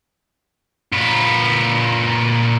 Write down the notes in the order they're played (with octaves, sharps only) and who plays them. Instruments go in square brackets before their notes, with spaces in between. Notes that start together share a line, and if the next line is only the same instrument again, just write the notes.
[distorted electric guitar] A#2 B4